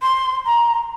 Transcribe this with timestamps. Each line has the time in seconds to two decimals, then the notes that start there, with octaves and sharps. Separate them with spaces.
0.02 C6
0.45 A#5